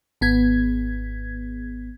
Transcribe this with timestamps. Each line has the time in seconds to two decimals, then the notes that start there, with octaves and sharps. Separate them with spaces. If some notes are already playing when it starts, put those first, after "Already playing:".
0.21 G#1 B3 G#6